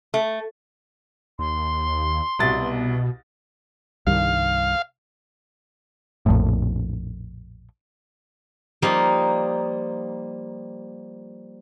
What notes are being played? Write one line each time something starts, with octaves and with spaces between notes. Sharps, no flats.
A3
D#2 C6
C2 B2 A6
C2 G2 D#3 F5
A#1 F2 A2
F3 G3 A#3 D#4